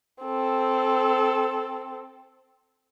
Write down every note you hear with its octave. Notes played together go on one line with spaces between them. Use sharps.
C4 A4